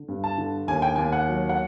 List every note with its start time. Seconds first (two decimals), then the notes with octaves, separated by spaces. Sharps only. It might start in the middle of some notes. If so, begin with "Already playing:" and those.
Already playing: D3
0.08 G2
0.24 A5
0.38 D3
0.68 D#2 G#5
0.82 G5
0.96 D#2 G#5
1.12 F#5
1.28 F#3
1.49 F#5